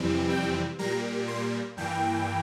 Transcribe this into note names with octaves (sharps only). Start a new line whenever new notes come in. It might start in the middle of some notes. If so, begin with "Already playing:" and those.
Already playing: F2 C3 E3 G3 C4
G5
A#2 G3 A#3 A#5
C6
G2 E3 A#3 G5